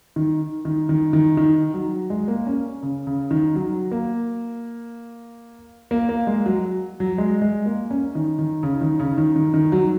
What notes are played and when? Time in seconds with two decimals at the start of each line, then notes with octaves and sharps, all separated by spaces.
0.16 D#3
0.65 D#3
0.89 D#3
1.13 D#3
1.37 D#3
1.74 F#3
2.10 G#3
2.28 A#3
2.47 C#4
2.83 C#3
3.07 C#3
3.31 D#3
3.55 F#3
3.91 A#3
5.91 A#3
6.09 A#3
6.27 G#3
6.46 F#3
7.00 F#3
7.18 G#3
7.42 G#3
7.66 A#3
7.91 C#4
8.15 D#3
8.39 D#3
8.63 C#3
8.81 D#3
9.00 C#3
9.18 D#3
9.36 D#3
9.54 D#3
9.72 F#3